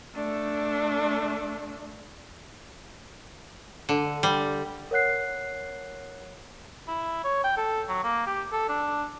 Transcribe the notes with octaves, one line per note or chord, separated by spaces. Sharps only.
A3 D4
D3
G3
A#4 C#5 F#5 F#6 C7
E4
C#5
G5
A4
F#3
A#3
G4
A4
D4